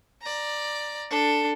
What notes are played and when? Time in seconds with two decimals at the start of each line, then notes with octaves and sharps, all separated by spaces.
0.21 D5 A#5
1.10 D4 A4